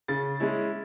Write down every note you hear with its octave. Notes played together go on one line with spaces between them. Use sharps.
C#3 A6
G#3 C#4 E4